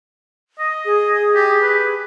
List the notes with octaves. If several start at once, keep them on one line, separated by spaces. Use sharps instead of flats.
D#5
G#4
G4
B4